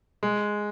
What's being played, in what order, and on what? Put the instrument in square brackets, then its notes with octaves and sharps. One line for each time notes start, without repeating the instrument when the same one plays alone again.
[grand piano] G#3